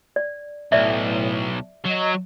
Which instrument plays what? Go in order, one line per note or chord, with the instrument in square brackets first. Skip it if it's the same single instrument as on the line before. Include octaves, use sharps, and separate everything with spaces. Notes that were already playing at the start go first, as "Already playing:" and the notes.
[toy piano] D5
[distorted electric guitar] B1 [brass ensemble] A2 [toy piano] D5 E5
[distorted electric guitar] F#3 [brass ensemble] D#5